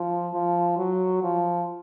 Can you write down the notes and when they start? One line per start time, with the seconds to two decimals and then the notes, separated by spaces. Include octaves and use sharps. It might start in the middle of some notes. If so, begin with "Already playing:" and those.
Already playing: F3
0.34 F3
0.77 F#3
1.23 F3